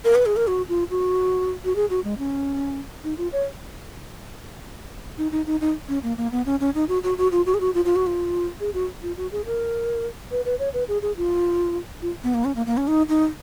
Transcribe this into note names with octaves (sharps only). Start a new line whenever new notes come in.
A#4
B4
G#4
A#4
F#4
F4
F#4
F#4
G#4
F#4
G#3
C#4
D#4
F4
C#5
D#4
D#4
D#4
D#4
C#4
A#3
A#3
B3
C#4
C#4
D#4
F#4
F#4
F#4
F4
F#4
G#4
F#4
F4
F4
F#4
F4
G#4
F#4
F4
F#4
G#4
A#4
B4
B4
C#5
B4
G#4
G#4
F4
F4
B3
A#3
C#4
A#3
A#3
C#4
D#4
D#4